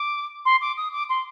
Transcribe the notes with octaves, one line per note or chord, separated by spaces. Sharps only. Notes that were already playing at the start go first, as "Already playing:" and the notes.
Already playing: D6
C6
D6
D#6
D6
C6